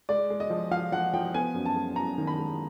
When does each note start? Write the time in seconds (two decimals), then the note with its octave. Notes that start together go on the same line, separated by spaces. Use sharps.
0.09 G#3 D5
0.30 G#3
0.40 D#5
0.50 F3
0.71 F3 F5
0.92 F3 F#5
1.13 F3 G5
1.34 B3 G#5
1.54 F#2
1.66 A5
1.75 G#3
1.96 F#2 A#5
2.18 D#3
2.27 B5
2.39 G#3